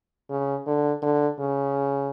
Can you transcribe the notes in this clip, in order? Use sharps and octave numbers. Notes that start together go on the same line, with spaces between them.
C#3
D3
D3
C#3